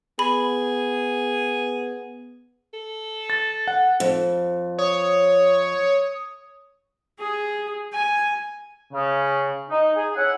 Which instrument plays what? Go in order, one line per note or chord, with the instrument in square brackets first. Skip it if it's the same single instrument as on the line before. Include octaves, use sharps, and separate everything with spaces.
[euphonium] B3 [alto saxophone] G#4 [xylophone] B5
[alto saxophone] A4
[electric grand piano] A6
F#5
[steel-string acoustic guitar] F2
[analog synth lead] C#5 [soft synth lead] D#6
[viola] G#4
G#5
[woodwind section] C#3
D#4
G#4
C#4 E4 F#5